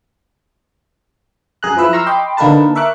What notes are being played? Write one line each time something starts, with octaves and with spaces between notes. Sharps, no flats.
F#2 G#4 A#5 F#6
F3 E4 B4 E6 F#6
A#5 C6 C#6 E6 F6
D#5 G5 B5 C6 D6
D3 A#3 D#4 A#4 B4 A5
A#4 E5 C#6 D6 F#6